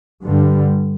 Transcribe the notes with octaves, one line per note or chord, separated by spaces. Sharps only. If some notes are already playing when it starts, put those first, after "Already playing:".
G2 D3 G3